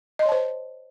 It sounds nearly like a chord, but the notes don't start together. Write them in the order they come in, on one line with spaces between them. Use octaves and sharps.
D#5 C6 C#5 A5 C5